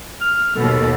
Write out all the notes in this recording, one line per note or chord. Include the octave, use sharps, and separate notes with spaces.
F6
D#2 B2 A4